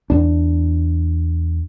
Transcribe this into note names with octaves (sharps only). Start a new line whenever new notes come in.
E2 D4